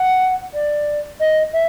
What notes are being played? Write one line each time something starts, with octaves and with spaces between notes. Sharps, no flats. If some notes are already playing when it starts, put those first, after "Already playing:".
Already playing: F#5
D5
D#5
E5